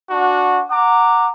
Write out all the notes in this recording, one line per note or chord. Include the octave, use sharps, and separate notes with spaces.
D4 F#4
F#5 A#5 D6